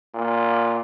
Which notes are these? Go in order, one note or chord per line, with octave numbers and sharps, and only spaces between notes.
A#2